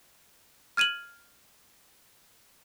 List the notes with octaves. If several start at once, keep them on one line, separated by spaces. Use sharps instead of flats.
F6 G#6 D#7 F7 F#7